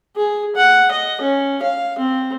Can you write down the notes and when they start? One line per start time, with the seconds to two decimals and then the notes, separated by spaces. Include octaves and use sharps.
0.16 G#4
0.56 F#5
0.91 D#5
1.21 C#4
1.62 F5
1.98 C4